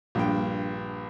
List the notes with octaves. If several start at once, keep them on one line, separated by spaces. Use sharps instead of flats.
A#1 G2 G5